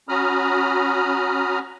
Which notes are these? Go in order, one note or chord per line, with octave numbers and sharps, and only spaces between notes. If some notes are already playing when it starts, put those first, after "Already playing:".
C#4 F#4 A#5 B5 D#6 F6